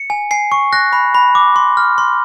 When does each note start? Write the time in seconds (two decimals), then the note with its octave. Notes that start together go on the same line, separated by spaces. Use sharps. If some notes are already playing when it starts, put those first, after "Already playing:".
Already playing: C#7
0.10 G#5
0.31 G#5 C7
0.52 C#6
0.73 F#6 A#6
0.93 B5
1.14 B5
1.35 D6
1.56 C6
1.77 F6
1.98 C6